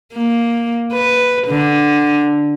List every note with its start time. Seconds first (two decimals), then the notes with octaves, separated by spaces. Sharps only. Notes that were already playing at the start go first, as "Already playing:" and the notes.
0.13 A#3
0.93 B4
1.47 D3